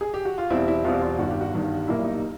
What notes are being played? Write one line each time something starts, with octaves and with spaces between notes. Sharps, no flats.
G#4
G4
F#4
F4
E2 B2 G3 C4 E4
E4
E2 B2 G3 C4 F4
F4
G1 G2 D#3 G3 F#4
G4
F#4
G1 G2 D#3 G3
B1 A#2 G3 A#3 E4
D#4